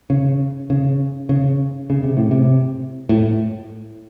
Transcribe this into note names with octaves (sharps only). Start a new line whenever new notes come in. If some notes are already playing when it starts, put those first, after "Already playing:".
C#3
C#3
C#3
C#3
C3
A2
C3
A2